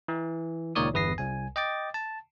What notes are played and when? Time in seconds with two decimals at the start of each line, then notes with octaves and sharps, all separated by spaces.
0.08 E3
0.75 C#2 A#2 D#3 C#5 D5 D#6
0.94 G1 E2 B4 D#6 A#6 C7
1.18 C2 G#5
1.56 D#5 G5 D6 A6
1.94 A5